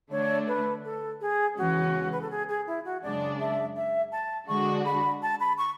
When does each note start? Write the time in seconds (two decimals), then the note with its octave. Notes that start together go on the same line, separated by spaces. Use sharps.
0.11 D3 A3 D4 C#5
0.47 B4
0.84 A4
1.21 G#4
1.57 E2 C#3 E3 G#3 C#4 F#4
2.12 B4
2.21 A4
2.30 G#4
2.48 G#4
2.67 E4
2.85 F#4
3.03 F#2 C#3 G#3 D4 D5
3.40 E5
3.76 E5
4.12 A5
4.48 D3 G#3 D4 F#4 C#6
4.85 B5
5.22 A5
5.40 B5
5.58 C#6